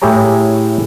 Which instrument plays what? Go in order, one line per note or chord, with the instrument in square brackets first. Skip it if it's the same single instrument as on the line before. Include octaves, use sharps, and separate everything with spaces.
[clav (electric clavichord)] A2 E4 G4 G#4 C#5 A#5